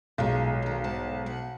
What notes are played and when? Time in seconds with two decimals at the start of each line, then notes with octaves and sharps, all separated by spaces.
0.18 B1 A#2 G#3 F4
0.62 A#2 D#3
0.84 G#2 F#5 A5
1.26 F#5